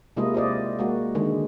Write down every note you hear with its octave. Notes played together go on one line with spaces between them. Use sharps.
C3 G#3 A#3 E4 F4 D#5
F4 C5 D5 D#5
G#3 A#3 F#4
D3 D#3 G#3